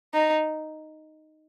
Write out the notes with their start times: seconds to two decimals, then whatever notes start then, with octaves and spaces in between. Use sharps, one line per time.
0.14 D#4